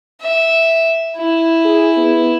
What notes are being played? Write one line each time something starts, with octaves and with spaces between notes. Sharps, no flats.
E5
E4
G#4
B3